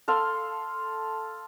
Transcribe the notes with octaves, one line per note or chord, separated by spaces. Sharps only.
A4 F5 C6